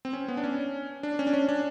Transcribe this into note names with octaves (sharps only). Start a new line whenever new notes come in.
C4
C#4
B3
D4
C#4
D4
C#4
D4
C#4
D4